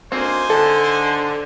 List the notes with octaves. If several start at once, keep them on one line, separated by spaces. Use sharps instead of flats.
D2 A#3 C4 D#4 C5 G#5
D3 A4